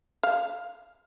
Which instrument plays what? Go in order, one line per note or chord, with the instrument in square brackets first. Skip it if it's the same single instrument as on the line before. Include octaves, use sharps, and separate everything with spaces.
[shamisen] F5